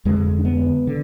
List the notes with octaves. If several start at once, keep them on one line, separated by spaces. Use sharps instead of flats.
F2 D3 G#3
D4
B3
D3